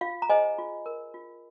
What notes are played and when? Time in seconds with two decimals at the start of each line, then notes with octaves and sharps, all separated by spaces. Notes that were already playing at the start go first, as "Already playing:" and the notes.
0.01 F4 F5
0.22 A#5
0.29 G#4 C5 D#5 G#5
0.58 F4
0.86 A#4
1.14 F4